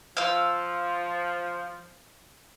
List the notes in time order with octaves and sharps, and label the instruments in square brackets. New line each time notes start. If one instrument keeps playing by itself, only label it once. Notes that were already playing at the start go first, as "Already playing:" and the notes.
[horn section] F3 [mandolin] F5 E6